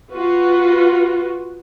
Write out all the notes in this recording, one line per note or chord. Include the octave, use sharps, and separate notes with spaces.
F4 F#4 B4